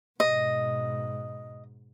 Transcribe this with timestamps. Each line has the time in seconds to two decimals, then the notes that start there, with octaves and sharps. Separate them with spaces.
0.20 G#2 B2 D#5